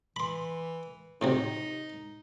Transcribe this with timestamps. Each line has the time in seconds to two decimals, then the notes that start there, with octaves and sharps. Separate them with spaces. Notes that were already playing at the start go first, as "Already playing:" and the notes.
0.16 E3 B5 C6
1.21 A2 C3 F#3 D#4